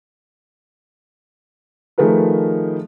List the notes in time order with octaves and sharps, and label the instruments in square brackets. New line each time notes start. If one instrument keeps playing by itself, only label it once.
[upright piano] D#3 F3 A3 G#4 A#4 B4